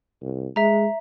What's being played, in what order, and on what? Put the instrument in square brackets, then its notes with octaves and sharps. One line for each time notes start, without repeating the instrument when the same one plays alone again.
[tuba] C2
[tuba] G#3 [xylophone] E5 A#5